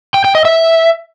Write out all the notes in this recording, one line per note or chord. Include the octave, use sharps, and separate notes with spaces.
G5
G5
D#5
E5